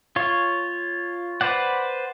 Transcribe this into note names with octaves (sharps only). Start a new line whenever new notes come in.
F4 C#5
B4 C5 D5 F#5